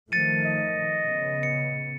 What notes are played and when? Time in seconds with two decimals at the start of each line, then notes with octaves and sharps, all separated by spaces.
0.12 D#3 F3 A3 A6 C#7 D#7
0.45 D#5
1.03 C#3 B3
1.43 C#7